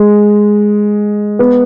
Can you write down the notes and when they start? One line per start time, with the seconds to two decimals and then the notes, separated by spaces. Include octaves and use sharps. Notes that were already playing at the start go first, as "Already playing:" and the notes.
Already playing: G#3
1.39 B3